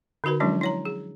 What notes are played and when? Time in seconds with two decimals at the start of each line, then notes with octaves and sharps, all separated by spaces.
0.24 D3 D#4 F#4 A#4 B4
0.40 F3 F#3 G#3 C#4 D4 E4
0.61 E4 C#5 A#5
0.85 G#4